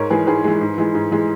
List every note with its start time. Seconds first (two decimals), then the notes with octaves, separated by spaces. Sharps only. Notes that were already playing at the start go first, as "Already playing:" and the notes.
Already playing: G#2 A#4 C#5
0.10 E3 G#3 G#4 B4
0.27 G#2 G#4 B4
0.44 E3 G#3
0.61 G#2
0.78 E3 G#3
0.95 G#2
1.11 E3 G#3